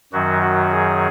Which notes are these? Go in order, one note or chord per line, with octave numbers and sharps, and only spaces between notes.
F#2 D#3 F#3 F#4
F#4
G#4